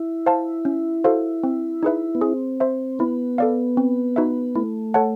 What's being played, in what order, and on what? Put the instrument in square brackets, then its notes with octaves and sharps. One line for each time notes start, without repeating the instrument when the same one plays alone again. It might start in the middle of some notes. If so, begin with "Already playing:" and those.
Already playing: [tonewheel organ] E4
[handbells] C5 F5 A5
C#4
F#4 A4 C5 F5
C4
D#4 G#4 B4 E5
[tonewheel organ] B3
[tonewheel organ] C4 [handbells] G#4
[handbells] C5 E5
[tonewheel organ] B3 [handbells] E4
[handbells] A4 D5 F5
C4
D#4 F#4 B4 E5
[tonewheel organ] A3 [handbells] E4
[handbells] A4 C#5 F#5 A5